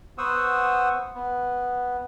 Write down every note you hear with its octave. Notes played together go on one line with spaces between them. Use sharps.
B3 C5 F#5 C#6 D#6 E6
B3